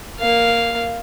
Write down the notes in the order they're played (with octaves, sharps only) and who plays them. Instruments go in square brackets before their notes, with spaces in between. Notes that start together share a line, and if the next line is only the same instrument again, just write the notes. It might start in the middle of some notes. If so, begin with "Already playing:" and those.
[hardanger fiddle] A#3 F5